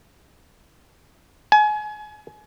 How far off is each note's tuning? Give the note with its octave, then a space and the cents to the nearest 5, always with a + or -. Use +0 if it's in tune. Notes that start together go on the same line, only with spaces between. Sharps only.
G#5 +30